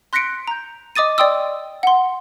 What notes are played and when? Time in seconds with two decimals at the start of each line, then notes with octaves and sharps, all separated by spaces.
0.13 C6 F#6 A#6 B6 C#7 D7
0.48 A#5 G6
0.96 D#5 D6 D#6 A6 D#7
1.18 D5 D#5 G5 C6 D#6 E6
1.83 F#5 C6